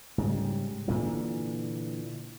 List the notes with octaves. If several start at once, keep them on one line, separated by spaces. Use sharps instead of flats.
G#2 C#3 G3
A#2 D3 E3